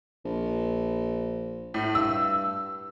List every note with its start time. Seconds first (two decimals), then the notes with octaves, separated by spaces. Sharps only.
0.25 A#1
1.74 A2
1.95 G2 E6